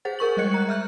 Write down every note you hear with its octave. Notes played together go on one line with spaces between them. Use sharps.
G#4 C5 F#5 A6
G#4 A#4 C#6 F#7
G3 G#3 D#5 F#6 G#6 C#7
A#5 F#6
E5 F6 G6